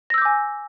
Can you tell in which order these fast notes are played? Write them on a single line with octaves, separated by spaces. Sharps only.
A#6 E6 G6 D6 G#5